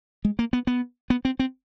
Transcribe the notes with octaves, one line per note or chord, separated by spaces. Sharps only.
G#3
A#3
B3
B3
B3
C4
C4